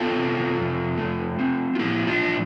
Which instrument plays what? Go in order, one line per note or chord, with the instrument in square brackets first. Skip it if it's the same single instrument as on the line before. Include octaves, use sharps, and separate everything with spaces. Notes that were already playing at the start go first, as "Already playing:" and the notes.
Already playing: [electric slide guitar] B3 F4 A4
C3
F2
A3
C4
F4
F3 E4 G4
D4 F4
A2